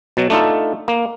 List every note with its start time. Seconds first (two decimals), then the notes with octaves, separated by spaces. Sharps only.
0.17 B2 F#3
0.30 A3 D4 D#4 F4 A4
0.88 A#3